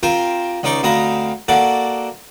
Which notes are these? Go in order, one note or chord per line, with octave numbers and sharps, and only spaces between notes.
C4 F4 G4 A#4 C5
C#2 C#4 D#4 D5 C6 C#6
D2 C4 D#5 F5 A#5 B5
A#3 F#4 A4 D5 F#5